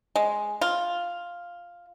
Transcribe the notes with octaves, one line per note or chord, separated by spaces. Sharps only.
G#3
F4